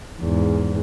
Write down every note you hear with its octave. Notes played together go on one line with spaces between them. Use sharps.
E2 G#2